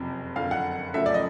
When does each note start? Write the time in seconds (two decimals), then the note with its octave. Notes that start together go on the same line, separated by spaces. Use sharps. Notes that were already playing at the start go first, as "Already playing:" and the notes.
Already playing: F#1 F2 C3
0.36 F#1 F2 D3 F5
0.51 F#5
0.94 F#1 F#2 C#3 F3 A3 E5
1.06 D5
1.14 D#5